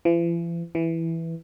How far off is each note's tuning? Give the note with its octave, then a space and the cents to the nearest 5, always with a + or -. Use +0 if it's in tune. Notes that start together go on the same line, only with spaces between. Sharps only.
E3 +45
E3 +0